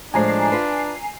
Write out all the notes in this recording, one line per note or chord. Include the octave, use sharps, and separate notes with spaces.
A2 F3 G#3 D4 G#5 A#5 C7
F4 B4